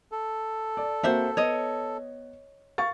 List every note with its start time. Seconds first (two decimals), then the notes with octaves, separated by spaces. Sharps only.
0.12 A4
0.77 D5
1.03 A#3 C4 F#4 C5 E5 F#5
1.37 B3 C#5 D#5
2.78 F5 C#6 A6